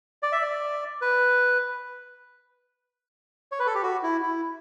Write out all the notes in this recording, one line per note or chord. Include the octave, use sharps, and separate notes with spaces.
D5
E5
D5
B4
C#5
B4
A4
G4
F#4
E4
E4